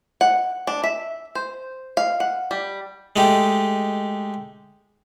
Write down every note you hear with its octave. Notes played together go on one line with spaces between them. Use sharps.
F#5
D4
E5
C5
F5
F#5
G3
G#3 A3 D#4 G4